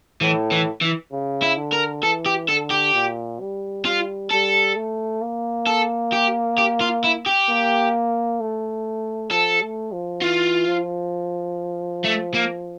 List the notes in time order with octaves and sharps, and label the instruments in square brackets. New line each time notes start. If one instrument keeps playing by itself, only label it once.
[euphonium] A2 [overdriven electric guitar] E3
[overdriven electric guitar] E3
E3
[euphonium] C#3
[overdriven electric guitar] E4
[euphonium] D3
[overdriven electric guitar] A#4
[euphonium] E3 [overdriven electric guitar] A4
[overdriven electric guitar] G4
[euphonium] D3 [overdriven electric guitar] A4
[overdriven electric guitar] G4
[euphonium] A#2
G3
[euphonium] G3 [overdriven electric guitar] F4
[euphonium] G3 [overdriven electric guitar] A4
[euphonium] A3
A#3
[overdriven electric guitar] A4
G4
G4
F4
E4
G4
[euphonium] A#3
A3
[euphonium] F3 [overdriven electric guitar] A4
[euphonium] A3
F3
[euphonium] E3 [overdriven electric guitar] F4
[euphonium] F3
[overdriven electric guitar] A3
A#3